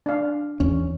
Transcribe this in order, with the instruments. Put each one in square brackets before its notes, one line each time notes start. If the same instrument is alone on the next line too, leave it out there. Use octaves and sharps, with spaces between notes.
[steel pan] D4 F5
[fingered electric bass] E2 C#4